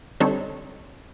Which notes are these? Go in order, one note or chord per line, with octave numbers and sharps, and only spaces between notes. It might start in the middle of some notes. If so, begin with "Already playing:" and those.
D3 G3 C4 D#4 A4 C#5